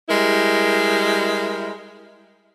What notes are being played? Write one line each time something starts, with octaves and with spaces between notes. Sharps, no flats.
G3 G#3 E4 A#4